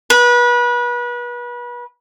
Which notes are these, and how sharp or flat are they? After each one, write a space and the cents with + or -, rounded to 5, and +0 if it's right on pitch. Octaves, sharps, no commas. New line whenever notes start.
B4 -30